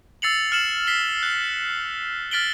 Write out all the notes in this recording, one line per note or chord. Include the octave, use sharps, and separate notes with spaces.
E6 A6 C7 C#7 F7 F#7
F6 C#7 E7 F#7
B6 C7 G7
F#6
F6 A6 B6 D7 F#7 G7